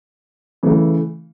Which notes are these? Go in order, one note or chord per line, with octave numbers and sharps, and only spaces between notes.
C#3 E3 A3